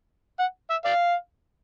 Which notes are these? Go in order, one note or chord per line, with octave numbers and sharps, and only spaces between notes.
F#5
E5
D5 F5